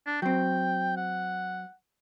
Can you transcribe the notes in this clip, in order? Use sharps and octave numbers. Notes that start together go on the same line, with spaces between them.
D4
F#3 C4 G5
F#5